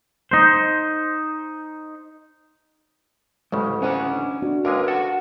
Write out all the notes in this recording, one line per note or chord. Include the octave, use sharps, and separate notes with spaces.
D#4 C5
A1 D2 C#3 G#3
C#4 C5 D#5 F#5 G#5 A#5
D4
D4 F#4
D#2 D3 G#3 A#4 B4
F#4 A4 F#5 A5